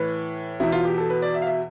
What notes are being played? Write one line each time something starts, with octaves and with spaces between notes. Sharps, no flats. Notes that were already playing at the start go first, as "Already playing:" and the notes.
Already playing: A2 E3 B4
E2 B2 E4
F4
G4
A4
B4
D5
E5
F5
E5